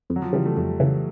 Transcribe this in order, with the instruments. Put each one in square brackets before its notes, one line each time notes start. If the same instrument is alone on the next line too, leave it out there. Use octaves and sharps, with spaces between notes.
[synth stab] F2
[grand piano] F#3
F3
[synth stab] C#3 E3 [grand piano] G3
[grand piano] A3
[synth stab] F2
C#3 E3